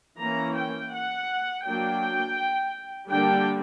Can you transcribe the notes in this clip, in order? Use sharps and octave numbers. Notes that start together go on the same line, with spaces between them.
E3 A#3 C#4 A#5
G5
F#5
F#3 A#3 D4 G5
D3 G3 A#3 D4 G5